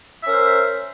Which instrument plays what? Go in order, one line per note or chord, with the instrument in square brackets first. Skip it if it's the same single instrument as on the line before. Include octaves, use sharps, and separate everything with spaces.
[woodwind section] E5
C#4
A#4
C5